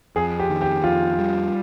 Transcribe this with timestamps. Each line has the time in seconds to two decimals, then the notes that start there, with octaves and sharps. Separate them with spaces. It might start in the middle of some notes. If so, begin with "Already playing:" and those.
0.16 F2 G#4
0.40 G4
0.50 D#3
0.62 G4
0.84 F2 F4
1.19 G3